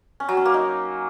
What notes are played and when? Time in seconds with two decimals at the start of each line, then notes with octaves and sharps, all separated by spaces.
0.20 C#4
0.29 F#3
0.37 C#4
0.45 A#3
0.54 D#4